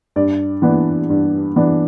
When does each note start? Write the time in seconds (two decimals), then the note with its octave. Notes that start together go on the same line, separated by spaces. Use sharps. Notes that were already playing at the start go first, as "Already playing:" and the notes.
0.16 G2 D5
0.62 E3 B3 D4
1.10 G2
1.56 E3 B3 D4